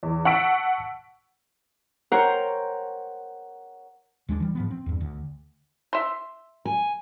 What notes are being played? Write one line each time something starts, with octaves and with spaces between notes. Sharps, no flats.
E2
F#5 A5 C#6 E6 B6 D7
A#4 C5 C#5 F#5 G5 A#5
D#2 G#3 C#4 D4
E3 G3
G#2 F3 B3
C4
E2 G2
D2
E5 C6
G#5